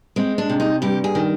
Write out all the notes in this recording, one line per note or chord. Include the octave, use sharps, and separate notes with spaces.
G#3 C4
D4
C3
D#4
G2 G4
G#4
D#3